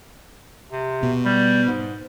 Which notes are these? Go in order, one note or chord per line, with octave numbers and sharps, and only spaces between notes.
C3
B2
G3
G#2